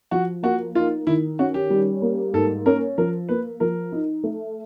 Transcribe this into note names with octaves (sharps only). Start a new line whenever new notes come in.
F3 F#4
A#3 F#4
D#4 F4
D#3 E4
C#4 F#4
G4
G3
A#3
G#2 A4
C#4 A#4
F3 A#4
A#3 B4
F3 A#4
D#4
A3